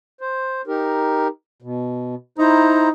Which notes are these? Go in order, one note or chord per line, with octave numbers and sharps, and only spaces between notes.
C5
D#4 G4 A#4
B2
D#4 E4 C5 A#5